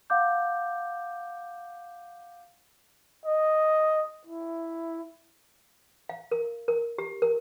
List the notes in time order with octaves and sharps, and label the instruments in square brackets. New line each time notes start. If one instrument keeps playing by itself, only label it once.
[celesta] F5 F#5 D6 G6
[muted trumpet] D#5
E4
[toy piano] F5
A#4
A#4
G4
A#4